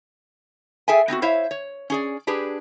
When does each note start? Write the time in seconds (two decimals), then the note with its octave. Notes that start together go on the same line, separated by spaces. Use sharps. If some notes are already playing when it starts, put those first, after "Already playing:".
0.88 G#4 A4 E5 G5 G#5
1.08 B3 C4 D#4 F#4
1.22 E4 C5 C#5 E5 F5
1.51 C#5
1.90 C#4 G#4 D5
2.27 D4 G4 G#4 B4